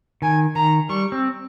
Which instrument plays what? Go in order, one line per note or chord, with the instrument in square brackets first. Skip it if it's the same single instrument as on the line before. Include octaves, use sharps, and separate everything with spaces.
[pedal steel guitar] D#3 [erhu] G#5
[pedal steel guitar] D#3 [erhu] A#5
[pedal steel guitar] G3 [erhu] C#6
[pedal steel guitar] C4